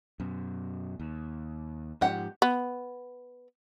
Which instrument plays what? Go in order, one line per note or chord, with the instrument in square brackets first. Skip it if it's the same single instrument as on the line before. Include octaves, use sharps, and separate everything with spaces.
[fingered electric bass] F#2 B2
D#2
[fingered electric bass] G#2 F3 [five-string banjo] G4 F#5
[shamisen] B3